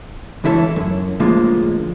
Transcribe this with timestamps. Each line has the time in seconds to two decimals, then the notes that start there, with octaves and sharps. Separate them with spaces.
0.44 C#2 E3 E4 A4 C#5
0.76 F#2
1.20 A2 D3 F3 G#3 A#3 F4